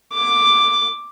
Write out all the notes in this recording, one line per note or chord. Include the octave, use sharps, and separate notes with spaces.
D6